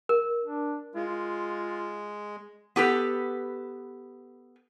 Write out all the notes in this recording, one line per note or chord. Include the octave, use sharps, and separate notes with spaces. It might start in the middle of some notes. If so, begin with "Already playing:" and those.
A#4
D4
G#3 F4
B3 G4 A4 B4